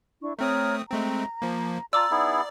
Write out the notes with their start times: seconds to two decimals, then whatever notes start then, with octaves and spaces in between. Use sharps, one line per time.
0.21 D4 E4 C#6
0.39 A3 C4 C#5 A#5 D#6 F6
0.90 G#3 A3 C4 A#5
1.42 F3 A#3
1.93 F4 D5 A5 A#5 D6 E6
2.11 B3 D#4 E4 G#4